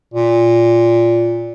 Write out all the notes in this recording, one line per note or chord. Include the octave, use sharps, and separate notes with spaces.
A#2